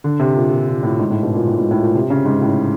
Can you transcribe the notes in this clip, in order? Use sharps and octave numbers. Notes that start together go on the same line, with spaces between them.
D3
C3
A#2
A#2
A#2
A2
G#2
A2
B2
A#2
A2
G#2
A2
A#2
C3
C#3
G#2
A2